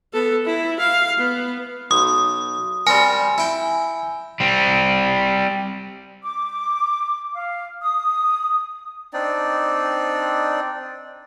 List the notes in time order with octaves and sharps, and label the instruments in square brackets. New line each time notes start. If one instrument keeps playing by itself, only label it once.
[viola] B3 A4
E4
F5
B3
[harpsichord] B1 [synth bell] D#6
[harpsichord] G3 C4 A#4 [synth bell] G#5
[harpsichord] E4 G5
[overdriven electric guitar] G3 C4
[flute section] D6
F5
D#6
[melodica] C4 D4 D#4 D5